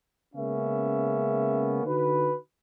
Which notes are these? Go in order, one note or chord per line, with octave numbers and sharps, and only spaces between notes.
C#3 G#3 A#3 B3 C#4 E5
D3 D#4 F#4 B4